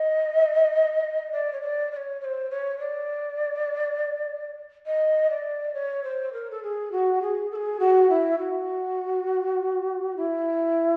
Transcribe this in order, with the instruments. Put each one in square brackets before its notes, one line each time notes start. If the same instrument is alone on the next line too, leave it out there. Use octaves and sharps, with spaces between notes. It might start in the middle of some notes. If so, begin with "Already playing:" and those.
Already playing: [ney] D#5
D5
C#5
D5
D5
C#5
C#5
C5
C#5
D5
D#5
D5
C#5
C5
A#4
A4
G#4
F#4
G#4
A4
G#4
F#4
E4
F#4
E4